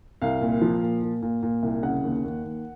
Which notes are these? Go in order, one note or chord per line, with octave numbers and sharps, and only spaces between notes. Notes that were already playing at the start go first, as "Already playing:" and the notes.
C2 F5
A#2
F3
A#2
A#2
A#2
A#2
C2
C#3 F#5
D#2
D#2
D#2